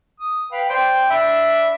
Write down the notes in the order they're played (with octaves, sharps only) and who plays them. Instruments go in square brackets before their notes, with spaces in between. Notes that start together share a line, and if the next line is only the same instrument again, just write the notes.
[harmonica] D#6
B4 F5 G5
[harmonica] C5 D5 [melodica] G5
[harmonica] D4 B5 [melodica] E5